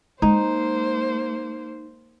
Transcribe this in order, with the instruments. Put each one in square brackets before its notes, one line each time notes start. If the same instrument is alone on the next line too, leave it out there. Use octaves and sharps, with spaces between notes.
[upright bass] G#3 [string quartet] A#3 C5 [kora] D#4